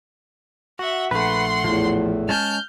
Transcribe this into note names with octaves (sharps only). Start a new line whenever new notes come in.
F#4 E5 F#5
A#1 A3 B4 F#5 C6
E2 A2 F3
G#3 C#4 G#5 A5 F6 G6